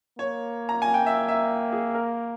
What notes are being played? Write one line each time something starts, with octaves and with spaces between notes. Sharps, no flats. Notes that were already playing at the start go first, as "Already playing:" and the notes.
A#3 C#5
A#5
G#5
G5
E5
E5
G#4
A#4